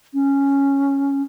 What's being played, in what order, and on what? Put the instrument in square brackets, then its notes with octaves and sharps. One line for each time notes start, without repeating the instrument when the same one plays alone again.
[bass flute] C#4